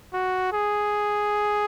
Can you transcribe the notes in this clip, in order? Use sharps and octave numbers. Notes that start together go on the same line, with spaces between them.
F#4
G#4